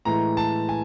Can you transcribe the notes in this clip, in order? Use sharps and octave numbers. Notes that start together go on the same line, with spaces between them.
A2 E3 G#3 A#5
A5
G#5